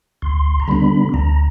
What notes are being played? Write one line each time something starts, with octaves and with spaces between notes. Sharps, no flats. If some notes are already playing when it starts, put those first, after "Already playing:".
D2 C6
A#5
D3 G3 B3 D4 B5
D2 A#5